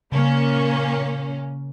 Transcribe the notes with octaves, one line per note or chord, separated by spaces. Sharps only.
A#2 C#3 A#3 C#4